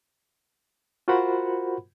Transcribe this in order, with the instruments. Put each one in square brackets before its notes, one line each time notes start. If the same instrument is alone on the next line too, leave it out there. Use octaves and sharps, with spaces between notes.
[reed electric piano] F4 F#4 A#4 C5 F#5 B5